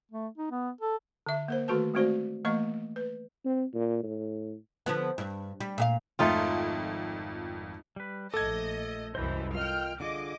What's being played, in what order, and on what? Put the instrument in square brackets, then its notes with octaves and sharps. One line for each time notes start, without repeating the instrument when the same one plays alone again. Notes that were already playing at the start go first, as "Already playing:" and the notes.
[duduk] A3
D#4
B3
A4
[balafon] D3 E5
A#3 A#4 C5
D#3 A3 F#4 A4 B4 A5
G#3 A3 C4 F#4 C5 D5
E3 A3 A#3 D#5 C#6
B4
[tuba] C4
A#2
A2
[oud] D3 F3 B3
G2
G3
A#2 G4 F5
[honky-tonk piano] G#1 F2 G5 [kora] A3 D#4 F4
[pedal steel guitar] G3 B4
[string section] A#1 D#5 [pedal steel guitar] A3 D6 [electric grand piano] A4 G#6
[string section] C2 F#2 E3 [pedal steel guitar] C5 D#5 G6
[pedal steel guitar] F4 A#4 D#5 [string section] G5 F6
[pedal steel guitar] D3 F4 G#4 [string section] D#5 D6